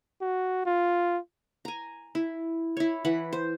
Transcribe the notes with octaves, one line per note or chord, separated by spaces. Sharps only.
F#4
F4
G#5 A#5
E4
E4 C#5
E3 F#5 B5
C5